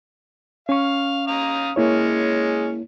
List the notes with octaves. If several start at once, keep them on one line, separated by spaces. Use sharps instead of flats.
C#4 F5 C#6
F5 A#5 D#6
G#3 A#3 C#4 E4 C#5